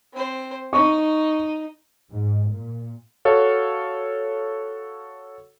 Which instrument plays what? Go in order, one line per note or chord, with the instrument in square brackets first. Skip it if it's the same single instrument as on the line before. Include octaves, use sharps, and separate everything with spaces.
[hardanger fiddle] C4 C5
[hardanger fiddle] D#4 [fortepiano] C#6
[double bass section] G#2
A#2
[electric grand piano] F#4 A4 C#5 F5